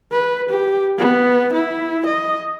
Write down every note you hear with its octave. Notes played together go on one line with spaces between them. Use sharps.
B4
G4
B3
E4
D#5